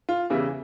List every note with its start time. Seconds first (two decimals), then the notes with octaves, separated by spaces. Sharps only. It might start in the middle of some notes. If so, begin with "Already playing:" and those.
0.09 F4
0.30 E2 C#3 E3 G3 E4